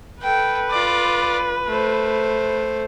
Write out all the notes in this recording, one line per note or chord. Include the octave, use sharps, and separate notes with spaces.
A4 B4 G5
F4 D5
A3 C5